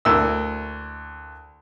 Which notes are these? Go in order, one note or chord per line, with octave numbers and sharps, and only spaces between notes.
D2 A#3 E4 E6